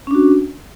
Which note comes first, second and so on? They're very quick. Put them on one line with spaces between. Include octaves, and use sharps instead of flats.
C#4 D4 F#4